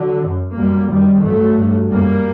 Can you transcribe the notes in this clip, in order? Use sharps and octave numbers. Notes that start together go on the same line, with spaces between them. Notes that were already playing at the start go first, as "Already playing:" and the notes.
Already playing: D3 F#3
F#2
F#2 G3 A#3
F#2 D#3 G3
G2 F#3 A3
G2
F#2 G3 A#3